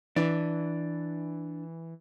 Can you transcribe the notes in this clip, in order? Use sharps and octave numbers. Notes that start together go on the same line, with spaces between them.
E3 D4